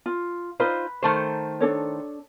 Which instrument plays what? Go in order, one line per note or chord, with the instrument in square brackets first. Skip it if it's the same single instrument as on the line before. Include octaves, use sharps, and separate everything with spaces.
[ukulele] F4
[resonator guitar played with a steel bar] D#4 F4 C5 [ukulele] B4
[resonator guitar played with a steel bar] D#3 A3 C5
[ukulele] D4 A4 C#5